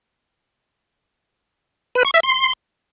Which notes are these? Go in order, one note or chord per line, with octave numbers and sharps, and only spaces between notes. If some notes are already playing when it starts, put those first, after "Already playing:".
B4
C#6
E5
C6